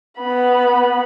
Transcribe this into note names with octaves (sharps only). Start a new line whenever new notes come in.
B3 B5